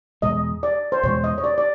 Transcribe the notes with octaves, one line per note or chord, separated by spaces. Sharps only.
E2 B2 G#3 D#5
D5
C5
E2 B2 G#3 C#5
D#5
C#5
D5
D5